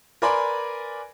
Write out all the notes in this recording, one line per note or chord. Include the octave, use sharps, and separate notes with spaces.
A#4 B4 D5 G#5 B5 C6